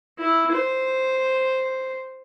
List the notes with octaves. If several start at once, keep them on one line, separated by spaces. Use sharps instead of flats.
E4
C5